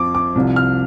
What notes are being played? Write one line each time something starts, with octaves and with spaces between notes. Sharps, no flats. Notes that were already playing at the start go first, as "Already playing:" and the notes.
Already playing: F2 F3 C4 D6
D6
C2 C3 F3
F6